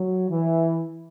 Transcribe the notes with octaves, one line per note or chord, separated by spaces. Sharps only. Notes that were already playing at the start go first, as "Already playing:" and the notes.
Already playing: F#3
E3